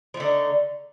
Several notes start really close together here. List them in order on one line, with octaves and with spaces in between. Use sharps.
F3 A3 D3 D#4